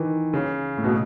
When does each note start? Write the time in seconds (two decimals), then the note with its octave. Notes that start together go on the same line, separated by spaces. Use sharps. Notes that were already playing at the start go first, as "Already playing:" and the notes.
Already playing: D#3 E3
0.33 C#3
0.77 A2
0.84 B2